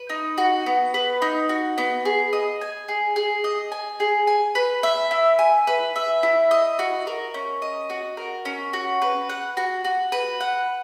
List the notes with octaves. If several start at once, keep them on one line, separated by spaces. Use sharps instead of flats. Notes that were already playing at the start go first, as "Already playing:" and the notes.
Already playing: B4
D#4
F#4
B3
B4
D#4
F#4
B3
G#4
D#5
G#5
G#4
G#4
D#5
G#5
G#4
G#5
B4
E5
E4
G#5
B4
E5
E4
D#5
F#4
A#4
C#4
D#5
F#4
A#4
C#4
F#4
B4
F#5
F#4
F#4
B4
F#5